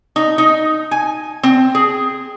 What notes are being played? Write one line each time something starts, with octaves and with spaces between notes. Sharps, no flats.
D#4
D#4
G#5
C4
G#4